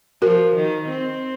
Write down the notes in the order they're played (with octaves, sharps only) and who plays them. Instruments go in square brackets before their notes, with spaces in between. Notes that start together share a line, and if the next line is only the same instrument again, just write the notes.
[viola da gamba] F3 [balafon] F#4 A#4
[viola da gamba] D#3
C4